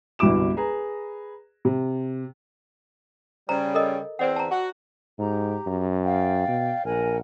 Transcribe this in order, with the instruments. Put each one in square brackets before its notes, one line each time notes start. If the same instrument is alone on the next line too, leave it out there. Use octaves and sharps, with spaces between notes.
[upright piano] G1 C2 B2 E4 D6 E7
G#4 B4 A#5
C3
[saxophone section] C#3 G3 [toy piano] C5 A#5
[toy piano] A4 A#4 D#5
[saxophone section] E2 C4 [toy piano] C5 D5 F#5
[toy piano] A5 A#5
[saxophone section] F#4
[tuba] G#2 [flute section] G4 A#5
[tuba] F#2
[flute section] D5 F5 G5
[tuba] B2
[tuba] A#1 [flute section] A#4 F#5 G#5